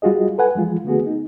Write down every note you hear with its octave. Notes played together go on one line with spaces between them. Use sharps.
G3 F4 F#4 G#4 D#5
A4 B4 F#5 G#5
E3 F3 G#3 F4
D3 A3 B3 F#4 G#4
D#4